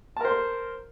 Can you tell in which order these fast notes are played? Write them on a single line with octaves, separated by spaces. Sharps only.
A5 A#4 C5